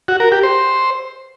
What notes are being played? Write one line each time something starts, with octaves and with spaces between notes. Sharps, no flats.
F#4
A#4
G4
C5